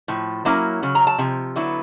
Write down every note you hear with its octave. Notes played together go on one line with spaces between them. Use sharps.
A2 F3
F#3 A#3 C#4 E4
C#3 F#3
A#5
A5
C3 F3
D3 F#3 B3 E4